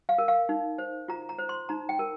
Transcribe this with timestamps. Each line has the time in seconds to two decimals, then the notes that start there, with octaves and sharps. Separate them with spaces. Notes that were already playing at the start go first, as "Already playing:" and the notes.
0.09 F5
0.18 A#4
0.28 F5
0.49 D#4
0.78 C5
1.08 F4 A#5
1.29 A#5
1.38 C5
1.49 C6
1.69 D#4 A#5
1.89 G5
1.99 A#4